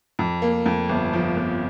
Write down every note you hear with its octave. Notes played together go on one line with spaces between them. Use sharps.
F2
A#3
F2
G1
F3
G1